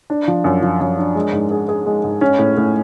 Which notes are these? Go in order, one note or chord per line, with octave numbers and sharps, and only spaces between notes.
D4
F3
F#2
F3
F#2
D4
G#3
G#2
G#4
G#4
G#3
G#2
C#4
A2
A2